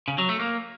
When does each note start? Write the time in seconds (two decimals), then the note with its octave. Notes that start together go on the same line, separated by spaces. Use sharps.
0.08 C#3
0.18 F#3
0.29 A3
0.39 A#3